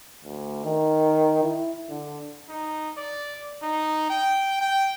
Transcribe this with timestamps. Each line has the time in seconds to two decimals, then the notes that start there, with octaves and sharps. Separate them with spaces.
0.24 D2
0.65 D#3
1.44 E4
1.89 D3
2.49 D#4
2.97 D5
3.62 D#4
4.10 G5
4.61 G5